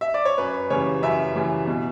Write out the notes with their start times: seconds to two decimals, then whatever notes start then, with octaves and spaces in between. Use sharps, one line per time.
0.01 E5
0.14 D5
0.25 C#5
0.38 F#2 B4
0.70 C#3 E3 G3 C#5
1.02 F#2 E5
1.36 C#3 E3 G3
1.67 B2